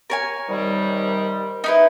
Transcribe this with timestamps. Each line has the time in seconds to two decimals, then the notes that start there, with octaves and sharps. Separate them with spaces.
0.10 A#4 C#5 G#5
0.49 C3 D#3 G3
1.64 D#4 E4 B4